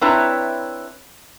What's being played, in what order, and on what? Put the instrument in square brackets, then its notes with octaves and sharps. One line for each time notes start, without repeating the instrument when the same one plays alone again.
[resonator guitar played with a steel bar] C4 D4 E4 B4 C#5 A#5